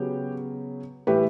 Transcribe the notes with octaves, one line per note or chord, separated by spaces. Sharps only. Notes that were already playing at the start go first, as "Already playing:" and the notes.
Already playing: C#3 F#3 B3 G4
A2 E3 G3 G4 B4